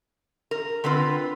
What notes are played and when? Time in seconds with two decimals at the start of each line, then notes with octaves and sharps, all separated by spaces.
0.51 A#4
0.84 D3 C4 F4 B4